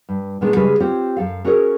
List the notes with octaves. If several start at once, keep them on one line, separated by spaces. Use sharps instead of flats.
G2
A#2 D#3 G#3 B3 D4
C#3 G3 G#3 C#4 G#4 B4
C4 F4 G4 C5 C#5
F#2 A4 F5
C#4 F#4 G#4 A#4 C#5